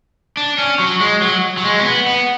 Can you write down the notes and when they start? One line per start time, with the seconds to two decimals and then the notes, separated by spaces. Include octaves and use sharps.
0.37 D4
0.58 C#4
0.79 F#3
1.00 G#3
1.22 F#3
1.57 F#3
1.64 G#3
1.80 C#4
1.85 B3
2.06 B3